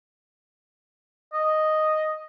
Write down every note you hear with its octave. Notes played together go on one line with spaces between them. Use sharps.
D#5